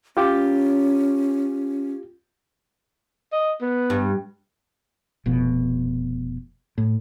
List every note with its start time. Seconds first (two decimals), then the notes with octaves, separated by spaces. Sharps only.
0.17 C#4 F4 G4
3.32 D#5
3.61 B3
3.90 G2
5.26 F1 F2 B2
6.78 A2